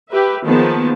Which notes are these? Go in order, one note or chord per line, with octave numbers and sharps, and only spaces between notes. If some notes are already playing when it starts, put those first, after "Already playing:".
G4 B4 E5
D#3 F3 A#3 B3 G#4 A5